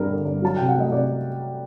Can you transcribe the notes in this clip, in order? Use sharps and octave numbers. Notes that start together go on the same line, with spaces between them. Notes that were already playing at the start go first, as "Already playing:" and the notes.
Already playing: G2 G3 A#4
D3
G2
F#3 A5
C3 G5
F#5
A3 D#5
C3 D5